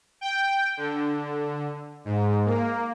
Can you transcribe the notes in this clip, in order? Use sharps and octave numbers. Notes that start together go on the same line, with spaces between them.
G5
D3
G#2
A#3